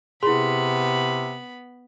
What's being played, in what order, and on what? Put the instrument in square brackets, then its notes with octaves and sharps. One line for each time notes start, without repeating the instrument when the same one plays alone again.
[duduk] C3 [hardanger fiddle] B3 B5 [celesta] E4 C6 [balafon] G#4